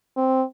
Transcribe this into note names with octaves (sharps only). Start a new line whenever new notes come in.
C4